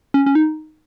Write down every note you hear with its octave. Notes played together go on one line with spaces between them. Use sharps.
C#4
C#4
D#4